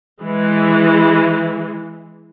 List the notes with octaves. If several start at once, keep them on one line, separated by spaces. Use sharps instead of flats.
E3 G#3